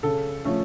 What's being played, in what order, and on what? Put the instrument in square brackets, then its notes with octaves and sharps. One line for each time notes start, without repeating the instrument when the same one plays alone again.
[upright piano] C#3 A4
F3 A3 C#4